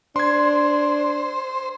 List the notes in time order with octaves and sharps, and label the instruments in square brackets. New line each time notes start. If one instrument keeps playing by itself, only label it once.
[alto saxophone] D4 [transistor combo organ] C5 [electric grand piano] C6 G#6